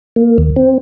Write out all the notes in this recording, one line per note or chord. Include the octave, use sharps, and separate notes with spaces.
A#3
D#2
C4